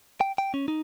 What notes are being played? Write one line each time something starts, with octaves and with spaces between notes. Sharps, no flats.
G5
G5
C#4
D#4